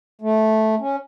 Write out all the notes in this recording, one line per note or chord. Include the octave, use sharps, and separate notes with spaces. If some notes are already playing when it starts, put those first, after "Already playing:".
A3
C#4